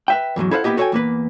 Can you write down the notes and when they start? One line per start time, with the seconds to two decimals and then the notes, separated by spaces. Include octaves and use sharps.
0.08 B4 E5 G5
0.36 E2 G#2 F3 F#3
0.51 E4 A4 C5 D#5 F5 F#5
0.64 A#3 B3 E4 G4 D#5
0.77 F#4 A4 C#5 E5 G5 G#5
0.92 E2 A#3 B4